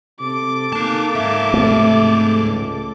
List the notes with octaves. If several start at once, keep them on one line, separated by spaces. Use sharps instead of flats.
C3 A4 D6
A#3 D#4 A5
G#2 E5
C3 A3
C#2